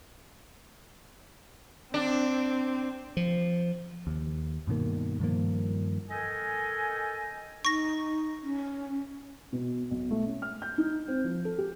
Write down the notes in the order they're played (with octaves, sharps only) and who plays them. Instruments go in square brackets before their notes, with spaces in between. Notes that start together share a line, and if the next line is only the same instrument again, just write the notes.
[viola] C4 [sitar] D4
[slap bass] F3
[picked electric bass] D#2
G2 B2 D#3 A#3
G2 D#3 F3 A#3
[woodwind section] A4 A#4 D#5 G5 G#5
[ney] D#4 [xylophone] C#6 A#6
[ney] C#4
[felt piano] B2
B1
A3
C#4
F6
G6
D#4
C4
F3
A4
G4